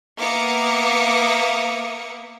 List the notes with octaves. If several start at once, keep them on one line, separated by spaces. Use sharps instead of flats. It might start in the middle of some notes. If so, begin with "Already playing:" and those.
A#3 B3 E5 D6 D#6 C#7